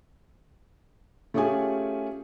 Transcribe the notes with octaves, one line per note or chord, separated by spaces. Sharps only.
A3 C#4 F4 G4 G#4 G#5